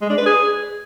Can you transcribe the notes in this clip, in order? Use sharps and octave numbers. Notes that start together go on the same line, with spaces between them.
G#3
D4
B4
G#4